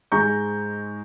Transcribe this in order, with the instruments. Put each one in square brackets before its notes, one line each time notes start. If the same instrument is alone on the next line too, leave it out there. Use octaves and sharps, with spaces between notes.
[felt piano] G#2 G#3 A#5 C#6 G6